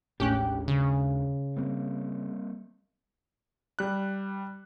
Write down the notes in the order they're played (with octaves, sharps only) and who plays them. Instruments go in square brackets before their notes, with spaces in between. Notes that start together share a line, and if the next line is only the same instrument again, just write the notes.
[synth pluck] A1 C#4 F#6 [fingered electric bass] D#2 G#3 D4 [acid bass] G4
[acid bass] C#3
[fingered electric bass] G3 A#3 C4
[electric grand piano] G3 F#6